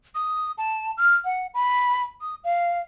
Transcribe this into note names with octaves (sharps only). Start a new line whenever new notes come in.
D#6
A5
F6
F#5
B5
D#6
F5